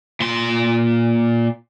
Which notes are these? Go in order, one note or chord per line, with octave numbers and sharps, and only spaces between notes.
A#2 C6